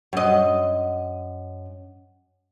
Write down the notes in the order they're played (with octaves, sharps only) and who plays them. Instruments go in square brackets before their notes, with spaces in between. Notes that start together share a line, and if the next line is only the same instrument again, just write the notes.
[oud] F#2 D#5